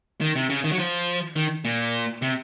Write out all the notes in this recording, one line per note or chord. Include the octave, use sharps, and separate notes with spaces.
D#3
C3
C#3
D#3
F#3
F3
D#3
A#2
C3